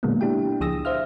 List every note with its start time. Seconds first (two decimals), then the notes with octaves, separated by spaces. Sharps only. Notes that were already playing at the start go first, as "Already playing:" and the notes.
0.03 A#2 D3 F#3 G#3 A#3 B3
0.21 D4 E4 G4 G5
0.61 C#2 F3 G#4 D#6 E6 A#6
0.85 C5 E5 F5 F6